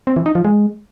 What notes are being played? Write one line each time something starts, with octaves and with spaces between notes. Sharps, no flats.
C4
E3
D#4
F3
G#3